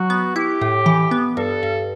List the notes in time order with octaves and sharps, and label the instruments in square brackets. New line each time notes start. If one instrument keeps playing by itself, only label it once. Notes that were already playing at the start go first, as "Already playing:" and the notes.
Already playing: [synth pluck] F#3 [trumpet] F#4
[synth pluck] B3
[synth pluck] E4 [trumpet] G4
[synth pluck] A2
E3
B3
[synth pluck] G2 [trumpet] A4
[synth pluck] G2